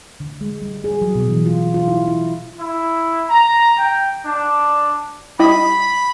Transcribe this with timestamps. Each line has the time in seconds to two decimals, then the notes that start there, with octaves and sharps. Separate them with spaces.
0.20 D3
0.41 G#3
0.62 G3
0.84 G#4
1.02 F#3
1.15 B2
1.29 E3
1.46 F4
1.74 F4
1.88 E4
2.07 E4
2.60 E4
3.29 A#5
3.79 G5
4.26 D4
5.39 G3 E4 D#5 B5